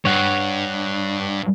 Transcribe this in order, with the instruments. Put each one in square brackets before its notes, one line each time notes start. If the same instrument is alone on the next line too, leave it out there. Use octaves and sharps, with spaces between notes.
[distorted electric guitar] G2 [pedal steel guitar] C#5 F#5